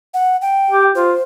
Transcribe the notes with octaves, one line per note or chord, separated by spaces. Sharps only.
F#5
G5
G4
F4 C5